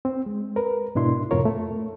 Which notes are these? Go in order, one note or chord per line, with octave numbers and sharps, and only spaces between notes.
C4
G#3
A#4 B4
G#2 B2 D4 E4 C6
F2 A2 C3 F4 A#4 C#5
A3